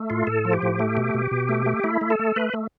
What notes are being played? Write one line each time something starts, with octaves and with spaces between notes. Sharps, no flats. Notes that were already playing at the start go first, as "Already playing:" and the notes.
Already playing: A3
A2 F4
A2 A4
F3
G4
A2
A3
B2
B2
B2
A3
A3
A3 E4
A3
A4
A3
A3 B4
A3